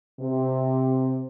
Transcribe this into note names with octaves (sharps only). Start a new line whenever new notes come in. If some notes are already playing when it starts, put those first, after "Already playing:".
C3